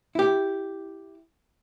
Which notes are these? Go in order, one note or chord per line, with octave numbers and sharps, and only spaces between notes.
E4 G4